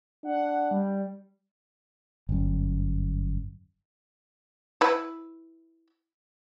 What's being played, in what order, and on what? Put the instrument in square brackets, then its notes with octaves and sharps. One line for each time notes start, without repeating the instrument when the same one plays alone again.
[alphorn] D4 [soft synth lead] F#5
[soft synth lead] G3
[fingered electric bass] G1 F#2
[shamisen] E4 B4